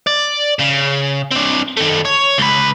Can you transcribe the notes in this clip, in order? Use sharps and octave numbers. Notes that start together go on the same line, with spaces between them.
D5
C#3
C4 D4
D#3 A3
C#5
C#2 B4